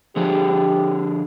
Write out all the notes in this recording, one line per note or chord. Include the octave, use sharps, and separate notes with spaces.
D3 F3 G4 G#4